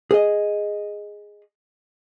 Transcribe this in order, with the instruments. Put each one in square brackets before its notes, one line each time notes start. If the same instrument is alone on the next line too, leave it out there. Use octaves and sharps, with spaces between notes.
[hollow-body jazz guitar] G#4 D#5